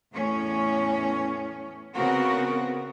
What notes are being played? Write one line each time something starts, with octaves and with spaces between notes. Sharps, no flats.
E2 A2 C#4
C#3 B3 C4 F#4 A#4